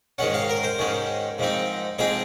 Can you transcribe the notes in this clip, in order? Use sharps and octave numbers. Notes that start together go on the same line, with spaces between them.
G#2 D#3 G#3 C#4 F#5
F5
A#4
C5
G#2 D#3 G#3 C#4
G#2 F3 C4 D#4
G#2 F3 C4 D#4 G#4